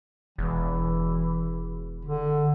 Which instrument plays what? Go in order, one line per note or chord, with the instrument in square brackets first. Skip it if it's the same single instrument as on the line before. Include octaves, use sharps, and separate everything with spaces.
[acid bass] E1 [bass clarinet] E3
[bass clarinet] D3